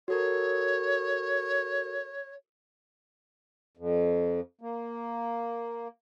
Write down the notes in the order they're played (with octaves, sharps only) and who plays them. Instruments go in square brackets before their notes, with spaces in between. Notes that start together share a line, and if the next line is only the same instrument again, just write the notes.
[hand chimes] F#4 A4 A#4 [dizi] C#5
[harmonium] F2
A#3